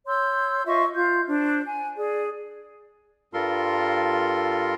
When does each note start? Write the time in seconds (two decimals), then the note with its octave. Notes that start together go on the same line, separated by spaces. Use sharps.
0.07 C#5 C6 E6 G6
0.66 F4 D#5 E5 C#6
0.94 F4 G6
1.27 D4 C5
1.64 G#5
1.97 G#4 D5
3.34 G2 G3 F4 A4 A#4 C6